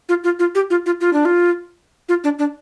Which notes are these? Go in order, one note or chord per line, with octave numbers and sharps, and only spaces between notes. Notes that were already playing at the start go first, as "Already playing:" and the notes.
F4
F4
F4
G4
F4
F4
F4
D4
F4
F4
D4
D4